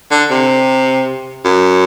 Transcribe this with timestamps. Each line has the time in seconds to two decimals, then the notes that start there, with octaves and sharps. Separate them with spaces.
0.11 D3
0.30 C3
1.45 F#2